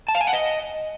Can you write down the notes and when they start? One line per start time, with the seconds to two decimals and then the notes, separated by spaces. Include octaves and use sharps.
0.09 A5
0.15 F5
0.21 G#5
0.27 F#5
0.33 D#5